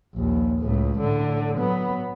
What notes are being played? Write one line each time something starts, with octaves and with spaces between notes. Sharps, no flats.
A#1 D#2
C#2 A2
A2 D3
F#3 B3